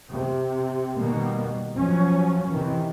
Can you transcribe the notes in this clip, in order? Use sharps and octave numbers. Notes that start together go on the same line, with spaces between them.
C3
B2 D#3 G3 A#3
F3 F#3 C#4
C3 D#3 E3